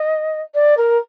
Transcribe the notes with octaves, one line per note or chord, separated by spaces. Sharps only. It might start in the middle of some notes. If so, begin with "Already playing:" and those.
Already playing: D#5
D5
A#4